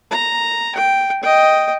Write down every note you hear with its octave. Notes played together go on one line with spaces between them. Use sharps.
A#5
G5
D#5 G5